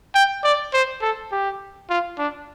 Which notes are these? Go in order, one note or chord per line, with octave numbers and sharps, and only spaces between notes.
G5
D5
C5
A4
G4
F4
D4